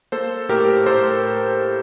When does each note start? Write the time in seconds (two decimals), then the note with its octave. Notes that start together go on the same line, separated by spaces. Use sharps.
0.12 A#3 A4 C5
0.49 A2 G4 A#4
0.86 A2 A4 C5